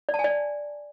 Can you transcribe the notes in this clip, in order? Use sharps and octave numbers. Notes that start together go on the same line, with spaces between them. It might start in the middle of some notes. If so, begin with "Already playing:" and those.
D5
A5
G#5
D5